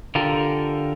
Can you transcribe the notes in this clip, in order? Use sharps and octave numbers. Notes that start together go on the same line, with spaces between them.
D3 F4 G4 A4 A#4